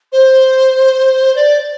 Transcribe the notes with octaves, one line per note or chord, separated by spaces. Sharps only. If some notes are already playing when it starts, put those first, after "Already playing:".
C5
D5